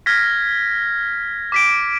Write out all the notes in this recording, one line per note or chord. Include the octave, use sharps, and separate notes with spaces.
F6 G#6 A#6 B6
D6 B6 D7